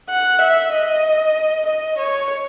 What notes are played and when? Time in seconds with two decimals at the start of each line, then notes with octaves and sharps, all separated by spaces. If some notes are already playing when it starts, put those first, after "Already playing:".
0.10 F#5
0.41 E5
0.72 D#5
1.66 D#5
1.98 C#5